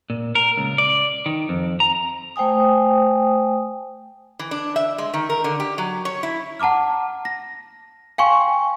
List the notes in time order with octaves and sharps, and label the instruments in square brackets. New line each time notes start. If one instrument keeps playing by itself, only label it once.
[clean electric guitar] A#2
A#4
C#2
D5
D#3
F2
A#5
[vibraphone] A3 C5 G5 G#5 D#6
[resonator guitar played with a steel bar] E3
D4
E5
G#3
D#3
A#4
D3
G4
F#3
C#5
E4
[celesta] F#5 A5 A#5 D6 F6
A#6
F5 G5 G#5 C6 C#6